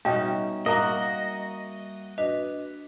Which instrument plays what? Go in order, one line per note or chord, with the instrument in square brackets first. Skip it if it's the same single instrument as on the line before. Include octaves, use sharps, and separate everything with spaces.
[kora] B2 C#4 D#4 [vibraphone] G3 E5 [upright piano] G5
[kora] A#3 [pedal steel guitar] F#4 D#5 [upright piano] A#4 F5 A#5
[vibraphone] D4 F#4 B4 [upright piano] D#5